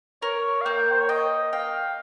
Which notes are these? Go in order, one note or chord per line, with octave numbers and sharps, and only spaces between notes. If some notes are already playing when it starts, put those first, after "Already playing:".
A#4 C#5
F5
A#3 G5
C5
C#5
D#5 G5
F5 G5